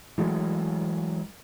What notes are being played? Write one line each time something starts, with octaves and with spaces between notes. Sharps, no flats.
E3 F#3 G#3 A3